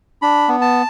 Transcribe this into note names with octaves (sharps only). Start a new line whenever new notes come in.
D4 B5
B3
A5